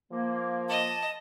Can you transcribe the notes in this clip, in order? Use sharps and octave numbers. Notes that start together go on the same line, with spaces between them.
F3 A#3
D#5 A5